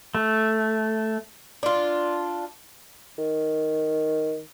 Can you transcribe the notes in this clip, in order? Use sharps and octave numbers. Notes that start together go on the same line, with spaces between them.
A3
D4 F4
D#3